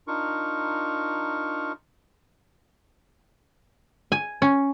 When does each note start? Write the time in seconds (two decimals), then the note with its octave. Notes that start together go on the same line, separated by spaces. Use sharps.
0.07 D4 D#4 F4 A#4 C#6
4.12 G#5
4.42 C#4